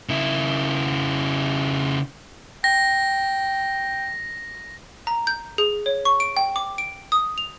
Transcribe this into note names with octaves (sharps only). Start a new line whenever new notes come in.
C#3 E4
G5 A#6
A#5
G6
G#4
C#5
C#6
D7
G5
D6
D7
D#6
F7